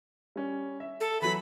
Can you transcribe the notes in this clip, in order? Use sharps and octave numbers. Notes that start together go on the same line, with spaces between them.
G3 C#4
E5
A4
E3 F#3 B5